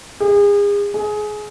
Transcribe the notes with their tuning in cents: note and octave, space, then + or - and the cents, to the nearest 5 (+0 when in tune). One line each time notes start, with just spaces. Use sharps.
G#4 -35
G#4 +20